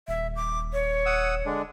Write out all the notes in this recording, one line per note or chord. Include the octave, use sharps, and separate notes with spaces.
D#1 E5
D6
C#5
F#5 D#6 E6
D3 G#3 D4